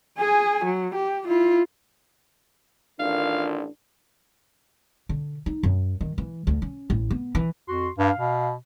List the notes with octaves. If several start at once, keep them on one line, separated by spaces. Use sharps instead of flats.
G#4 G#5
F#3
G4
E4 F4
A1 D#3 D4 F4 A#4 F5
D3
D#4
F#2
D#3
E3
D2
C#4
A1
B3
E3
F2 F#4 C6
G2 F5
B2